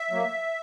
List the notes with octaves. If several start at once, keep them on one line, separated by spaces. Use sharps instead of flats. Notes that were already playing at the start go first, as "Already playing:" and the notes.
Already playing: E5
F#3 A#3